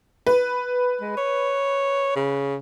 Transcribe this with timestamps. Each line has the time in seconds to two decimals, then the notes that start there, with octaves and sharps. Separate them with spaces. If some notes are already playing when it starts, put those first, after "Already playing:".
0.27 B4
1.01 G#3
1.17 C#5
2.16 C#3